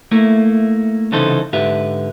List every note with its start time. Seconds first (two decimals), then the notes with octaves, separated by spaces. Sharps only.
0.11 A3 A#3 E4
1.12 C2 C#3 E3 D#4 A4 C5
1.53 G#2 D3 G4 B4 E5